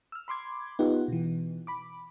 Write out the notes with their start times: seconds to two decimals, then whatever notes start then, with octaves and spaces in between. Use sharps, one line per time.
0.12 E6 F6
0.28 B5 C6 D6 G#6
0.79 B3 D#4 F4 G4 F#5
1.08 B2 E3
1.67 B5 D6